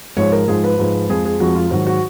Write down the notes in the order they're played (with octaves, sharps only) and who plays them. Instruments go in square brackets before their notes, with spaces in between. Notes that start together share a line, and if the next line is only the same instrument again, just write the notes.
[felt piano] G#2 F3 G#3 C#5
A#4
G#2 F3 G#3 G#4
B4
G#2 F3 G#3
F2 F3 G#3 G#4
G#4
F2 F3 G#3 F#4
F4
G#2 D#3 F#3 F#4
F#4